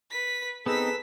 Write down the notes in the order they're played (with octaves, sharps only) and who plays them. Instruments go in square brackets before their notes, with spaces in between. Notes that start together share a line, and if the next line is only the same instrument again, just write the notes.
[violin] B4 B6
[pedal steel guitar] B3 C4 D#4 [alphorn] G#4 [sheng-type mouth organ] A4 B4 [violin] E6 B6